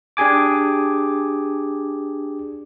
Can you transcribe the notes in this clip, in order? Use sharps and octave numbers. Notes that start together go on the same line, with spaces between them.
D4 G4 G#4 G#5 D6